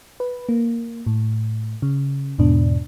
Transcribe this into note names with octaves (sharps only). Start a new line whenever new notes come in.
B4
A#3
A2
C#3
E2 G#2 B2 D4